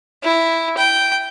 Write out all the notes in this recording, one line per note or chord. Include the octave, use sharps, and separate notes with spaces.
E4
G5